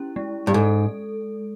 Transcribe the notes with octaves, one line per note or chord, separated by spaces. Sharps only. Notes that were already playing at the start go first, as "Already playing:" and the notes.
Already playing: C#4 E4 G4
G#3
G2
G#2 A4